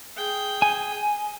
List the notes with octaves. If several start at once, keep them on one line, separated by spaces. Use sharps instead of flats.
G#4 G5
G#5